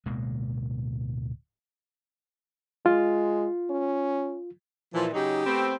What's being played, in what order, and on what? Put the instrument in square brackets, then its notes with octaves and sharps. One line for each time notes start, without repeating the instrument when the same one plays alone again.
[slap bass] D1 B2 G#3 A#3
[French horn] G#3 [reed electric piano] F4
[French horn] C#4
[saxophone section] A#2 E3 [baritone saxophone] F3
[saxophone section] C#3 F#3 D#4 [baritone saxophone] G4
[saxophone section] A3 B3 C4